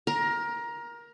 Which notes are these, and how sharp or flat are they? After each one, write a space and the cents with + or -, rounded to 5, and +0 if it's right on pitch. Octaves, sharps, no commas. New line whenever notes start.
A#4 +20 A#5 +0